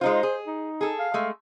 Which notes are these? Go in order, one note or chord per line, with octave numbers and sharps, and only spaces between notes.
G#3 D#4 F4 C5
G#4
D#4
G#4 A4
F5
G#3 A3